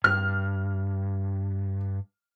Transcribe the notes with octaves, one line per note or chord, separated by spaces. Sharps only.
G2 F6